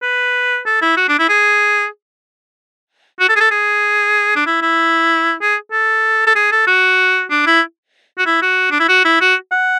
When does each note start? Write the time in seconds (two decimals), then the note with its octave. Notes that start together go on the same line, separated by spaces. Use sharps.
0.02 B4
0.66 A4
0.82 E4
0.97 F#4
1.08 D4
1.19 E4
1.29 G#4
3.20 F#4
3.29 A4
3.36 G#4
3.40 A4
3.51 G#4
4.36 D4
4.46 E4
4.62 E4
5.41 G#4
5.72 A4
6.26 A4
6.36 G#4
6.52 A4
6.67 F#4
7.30 D4
7.46 E4
8.18 F#4
8.26 E4
8.42 F#4
8.71 D4
8.79 E4
8.89 F#4
9.05 E4
9.21 F#4
9.52 F#5